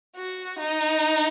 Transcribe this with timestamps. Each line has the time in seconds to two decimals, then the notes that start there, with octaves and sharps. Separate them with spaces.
0.17 F#4
0.59 D#4